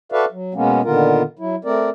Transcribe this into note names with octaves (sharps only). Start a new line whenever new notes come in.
F#4 A4 B4 D5 E5 F5
F#3
B2 G#3 A#3 B3 C#4
A#2 D3 D#3 B3 F4 A#4
F#3 E4
A3 C4 A#4 D5